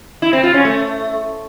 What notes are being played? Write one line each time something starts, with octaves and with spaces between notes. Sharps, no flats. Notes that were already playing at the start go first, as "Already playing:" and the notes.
E4
C4
F4
C#4
A3